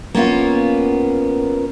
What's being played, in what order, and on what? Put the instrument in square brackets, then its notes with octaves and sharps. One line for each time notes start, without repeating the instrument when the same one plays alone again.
[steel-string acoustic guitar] A#3 B3 C#4 F4